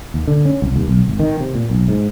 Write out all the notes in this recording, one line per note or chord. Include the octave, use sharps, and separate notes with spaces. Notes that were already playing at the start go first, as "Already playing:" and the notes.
D#2
D3
C#4
C2
D#2
B1
G#1
D#3
C3
A#2
B1
G#2